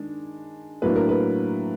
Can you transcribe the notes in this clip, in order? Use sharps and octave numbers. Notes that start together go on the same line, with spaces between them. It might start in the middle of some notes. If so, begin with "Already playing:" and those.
Already playing: D#3 G#3 D4
A2 F#3 A#3 D4 B4
A#4
B4